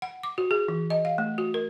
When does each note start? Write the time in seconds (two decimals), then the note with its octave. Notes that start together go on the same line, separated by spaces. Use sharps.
0.02 F#5
0.23 D6
0.38 F#4
0.51 G#4
0.68 E3
0.90 D#5
1.05 F5
1.18 A3
1.38 F#4
1.54 A#4